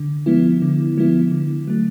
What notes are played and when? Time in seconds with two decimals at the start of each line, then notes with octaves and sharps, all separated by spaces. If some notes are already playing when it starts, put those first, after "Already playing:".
Already playing: D3
0.26 F3 G#3 B3 E4
0.62 D3
0.97 F3 G#3 B3 E4
1.32 D3
1.68 F#3 A3